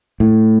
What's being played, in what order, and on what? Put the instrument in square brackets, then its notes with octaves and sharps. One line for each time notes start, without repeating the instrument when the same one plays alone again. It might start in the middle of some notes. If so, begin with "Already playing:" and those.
[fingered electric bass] A2